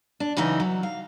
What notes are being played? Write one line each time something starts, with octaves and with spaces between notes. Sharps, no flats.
D4
F#2 C#3 E3 D#4 E5
F#3
F5